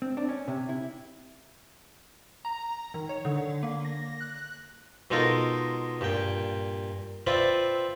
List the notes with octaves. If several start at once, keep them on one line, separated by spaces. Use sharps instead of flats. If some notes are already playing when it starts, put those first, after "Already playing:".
C4
D4
C#4
C3
E4
A#5
D#3
C#5
D3
A#3
A#6
F#6
B2 G#3 D#4 F4 A4 A#4
G2 A#2 G5
C4 F4 B4 D5 E5